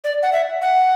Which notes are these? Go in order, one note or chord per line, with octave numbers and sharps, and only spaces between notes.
D5
F#5
E5
F#5